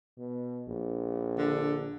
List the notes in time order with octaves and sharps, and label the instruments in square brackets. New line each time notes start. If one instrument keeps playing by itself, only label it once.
[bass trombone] B2
A#1
[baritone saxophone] D3